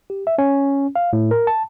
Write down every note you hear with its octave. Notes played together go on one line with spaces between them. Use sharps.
G4
E5
C#4
F5
A2
A#4
A5